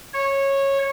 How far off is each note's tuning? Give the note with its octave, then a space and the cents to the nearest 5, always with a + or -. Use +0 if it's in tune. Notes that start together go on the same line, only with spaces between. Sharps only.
C#5 -15